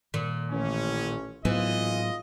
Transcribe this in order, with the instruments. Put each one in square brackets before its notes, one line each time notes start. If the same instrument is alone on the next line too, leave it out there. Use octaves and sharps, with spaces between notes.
[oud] A#2 [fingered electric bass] D#3
[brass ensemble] A1 C#4
[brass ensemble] G#1 F4 D#5 [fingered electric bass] A2 F#3 B3 [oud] E3